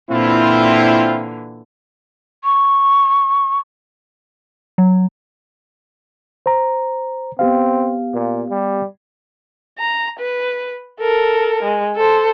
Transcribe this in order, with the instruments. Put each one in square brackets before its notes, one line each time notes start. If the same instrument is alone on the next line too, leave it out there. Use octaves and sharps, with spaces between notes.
[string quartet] A#2 D3 E3 [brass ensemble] C4 E4 F4
[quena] C#6
[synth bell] F#3
[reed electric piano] C5 A#5
[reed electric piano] B3 G4 F5 [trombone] C4
[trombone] A#2
G3
[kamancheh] A#5
B4
A4 A#4
G#3
A4 C5